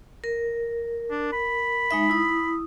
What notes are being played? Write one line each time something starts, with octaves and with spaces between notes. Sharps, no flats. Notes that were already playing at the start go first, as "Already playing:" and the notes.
A#4
D4
B5
G#3 D#4 E5
E4 D#6